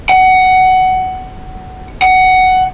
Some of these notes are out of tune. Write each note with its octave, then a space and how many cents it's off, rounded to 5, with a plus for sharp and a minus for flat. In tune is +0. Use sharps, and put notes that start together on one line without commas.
F#5 +15
F#5 +10